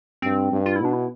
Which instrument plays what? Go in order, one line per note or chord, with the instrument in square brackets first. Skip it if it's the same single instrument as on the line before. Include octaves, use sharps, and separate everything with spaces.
[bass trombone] G2 [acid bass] C4
[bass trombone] G2
[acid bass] F4
E4
[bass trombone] B2 [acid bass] D4
[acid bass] E4